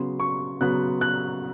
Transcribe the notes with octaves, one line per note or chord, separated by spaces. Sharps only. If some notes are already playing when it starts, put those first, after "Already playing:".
Already playing: C#3 F#3 B3 C6
C#6
C#3 F#3 B3 F#6
F#6